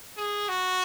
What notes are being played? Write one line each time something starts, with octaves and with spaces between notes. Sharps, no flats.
G#4
F#4